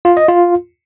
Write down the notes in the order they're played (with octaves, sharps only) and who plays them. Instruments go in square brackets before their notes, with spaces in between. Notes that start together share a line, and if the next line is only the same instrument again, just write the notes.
[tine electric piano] F4
D#5
F4